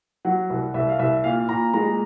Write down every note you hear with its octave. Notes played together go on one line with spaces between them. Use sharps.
F#3 F#5
C2
C2 E5
F5
C2 E5
A#2 F5
A#2 A#5
G#3 A#5